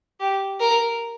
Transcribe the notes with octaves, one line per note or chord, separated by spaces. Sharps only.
G4
A#4